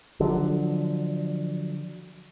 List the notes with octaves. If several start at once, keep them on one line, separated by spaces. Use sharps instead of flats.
D3 F3 F#3